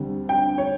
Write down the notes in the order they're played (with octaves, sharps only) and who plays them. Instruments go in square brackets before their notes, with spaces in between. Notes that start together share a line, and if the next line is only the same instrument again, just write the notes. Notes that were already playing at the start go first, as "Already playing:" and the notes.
Already playing: [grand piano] D2 D3 G3 C4
G5
C#5